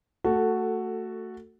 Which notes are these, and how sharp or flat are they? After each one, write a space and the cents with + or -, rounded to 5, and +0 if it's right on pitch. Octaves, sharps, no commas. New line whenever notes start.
A3 +20 F#4 +0 A4 +5